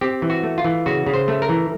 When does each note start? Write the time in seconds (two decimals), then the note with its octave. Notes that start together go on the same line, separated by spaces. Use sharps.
0.01 C4 G4
0.22 E3
0.30 F#4
0.43 A3
0.58 F4
0.64 E3
0.86 C#3 F#4
1.06 C#3
1.14 C5
1.28 A3
1.42 A#4
1.49 E3